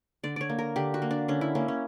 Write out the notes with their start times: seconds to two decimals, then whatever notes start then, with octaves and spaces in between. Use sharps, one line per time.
0.24 D3 D5
0.36 C#5 D5
0.49 A#3
0.59 A#4
0.76 D3 G4
0.94 F#4
1.02 A#3
1.11 D4
1.28 D3 C#4
1.41 E4
1.55 A#3 C#4
1.68 C#4